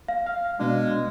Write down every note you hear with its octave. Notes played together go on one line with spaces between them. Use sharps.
F5
F5 F6
B2 G#3 D4